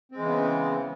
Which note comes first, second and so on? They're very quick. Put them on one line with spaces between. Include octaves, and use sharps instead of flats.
C4 G#3 E3 C#3 B3